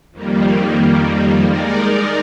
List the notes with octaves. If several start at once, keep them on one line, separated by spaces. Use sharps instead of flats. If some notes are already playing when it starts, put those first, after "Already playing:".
F2 D#3 G3 A#3
G#3 D#4 A#4 D5